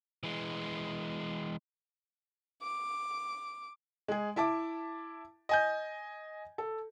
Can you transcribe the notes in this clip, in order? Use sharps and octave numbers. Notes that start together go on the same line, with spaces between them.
E3 G#3
D6
G#3 G#4
E4 E5 A5 D6
D#5 G#5 G6
A4